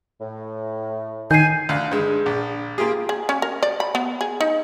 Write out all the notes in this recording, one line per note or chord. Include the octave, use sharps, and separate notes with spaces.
A2
D#3 G#5 G6 C7
D2 F5 F#6
G2 G#3
A#1
A#3 F4 G4 G#4
G#4
C#4
A#4
D5
B5
B3
G#4
D#4